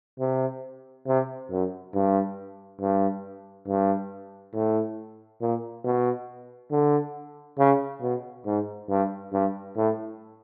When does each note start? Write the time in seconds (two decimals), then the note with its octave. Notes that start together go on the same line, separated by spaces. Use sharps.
0.20 C3
1.07 C3
1.51 F#2
1.94 G2
2.81 G2
3.68 G2
4.54 A2
5.41 A#2
5.84 B2
6.71 D3
7.58 C#3
8.02 B2
8.46 G#2
8.90 G2
9.33 G2
9.77 A2